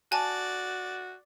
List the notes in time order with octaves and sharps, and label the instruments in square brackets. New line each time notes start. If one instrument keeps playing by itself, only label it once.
[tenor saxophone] F#4 [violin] D5 [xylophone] G#5 A5